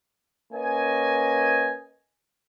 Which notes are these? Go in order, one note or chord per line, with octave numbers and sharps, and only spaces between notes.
A#3 C#4 B4 D#5 G#5